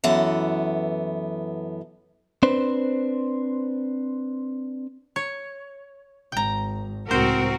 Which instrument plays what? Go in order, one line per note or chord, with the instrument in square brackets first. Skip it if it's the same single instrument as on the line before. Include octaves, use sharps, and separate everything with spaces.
[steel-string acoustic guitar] F#2 E3 B3 A4 F#5
[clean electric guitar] C4 D4 B4 C5
[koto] C#5
[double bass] G#1 [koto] G5 A#5
[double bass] C#2 A2 [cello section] C4 F#4 A#4 [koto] C5